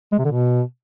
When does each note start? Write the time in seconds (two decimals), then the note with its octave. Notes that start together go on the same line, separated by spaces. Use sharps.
0.12 G#3
0.19 C3
0.25 D3
0.31 B2